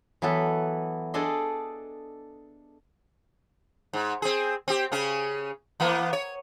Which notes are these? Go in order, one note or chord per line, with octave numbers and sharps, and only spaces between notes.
E3 F#3 B3 A4 B4
D4 G#4 A4 D5 D#5 C6
G#2
C4 G#4
C4 G4
C#3 C#4 G#4
E3 A#3 B3
C#5